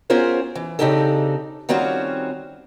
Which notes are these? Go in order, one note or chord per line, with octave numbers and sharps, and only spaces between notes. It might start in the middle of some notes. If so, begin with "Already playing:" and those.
B3 C#4 F4 G#4 A#4 C5
E3
C#3 C4 D4 D#4 G4 A4
D#3 G3 C4 C#4 F4 F#4